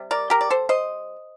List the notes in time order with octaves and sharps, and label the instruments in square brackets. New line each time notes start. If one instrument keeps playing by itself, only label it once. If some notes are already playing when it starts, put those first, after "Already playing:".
Already playing: [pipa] C3 G3
A#4 D5
G4 A#4
D5
A4 C5
C5 D#5